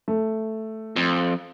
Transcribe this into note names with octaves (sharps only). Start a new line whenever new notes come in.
A3
F2